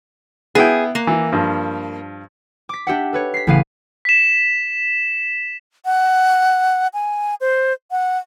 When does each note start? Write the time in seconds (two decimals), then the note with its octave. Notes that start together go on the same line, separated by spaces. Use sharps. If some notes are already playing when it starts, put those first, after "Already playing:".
0.55 B3 E4 G#4 G5
0.95 A#3
1.07 E3
1.32 G2 F3
2.69 D6 B6
2.87 D4 G4 E5 F#5
3.13 A4 B4 C#5
3.34 B6 C7
3.47 A1 C#3 B3 F5 D#7
4.05 B6 E7
5.85 F#5
6.94 G#5
7.41 C5
7.91 F#5